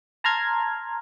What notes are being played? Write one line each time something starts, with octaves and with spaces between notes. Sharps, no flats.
A5 A#5 C6 F6 G#6